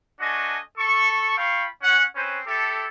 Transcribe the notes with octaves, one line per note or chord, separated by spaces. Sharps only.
A3 D4 F#4 D#5 G#5
A4 C#6
F4 F5 G5 B5 C#6
C#4 F#5
C4 C#4 B4 C5
E4 G4 A4